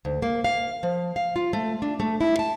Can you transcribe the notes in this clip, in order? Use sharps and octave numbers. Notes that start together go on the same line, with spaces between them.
D2
A#3
F5
F3
F5
F4
A3
D4
A3
E4
A5